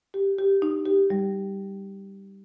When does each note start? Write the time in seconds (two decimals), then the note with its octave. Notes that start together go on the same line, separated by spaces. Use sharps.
0.14 G4
0.38 G4
0.62 D#4
0.86 G4
1.10 G3